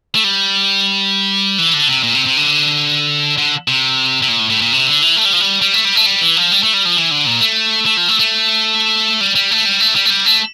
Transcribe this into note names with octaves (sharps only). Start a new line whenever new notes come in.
A3
G3
E3
D3
C3
A#2
C3
C3
D3
D3
C3
C3
A#2
A2
A2
A#2
C3
D3
E3
A3
G3
F3
G3
G3
A3
G3
A3
G3
E3
F3
G3
A3
G3
F3
E3
D3
A#2
A3
A3
F3
A3
A3
G3
G3
A3
G3
A3
G3
A3
G3
A3